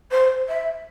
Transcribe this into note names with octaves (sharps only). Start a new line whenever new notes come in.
C5
E5